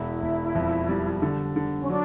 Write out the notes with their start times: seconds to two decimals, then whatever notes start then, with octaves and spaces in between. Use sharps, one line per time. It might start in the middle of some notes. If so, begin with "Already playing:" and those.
Already playing: E1 E4
0.22 E1
0.55 F2
0.89 G3
1.22 D3
1.56 D3
1.80 C#4
1.89 F#3 D4